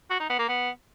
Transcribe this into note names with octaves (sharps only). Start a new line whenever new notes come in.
F#4
D#4
B3
A#3
B3